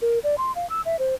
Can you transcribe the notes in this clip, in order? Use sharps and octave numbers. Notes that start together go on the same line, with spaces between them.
A#4
D5
C6
F5
E6
E5
C5